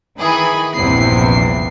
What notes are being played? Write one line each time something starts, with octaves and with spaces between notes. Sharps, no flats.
D#3 E3 G#4 B5
A#1 E2 G2 C3 C7